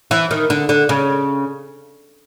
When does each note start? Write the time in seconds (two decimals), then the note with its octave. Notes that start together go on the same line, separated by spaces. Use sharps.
0.11 E3
0.31 D#3
0.50 D3
0.69 D3
0.89 C#3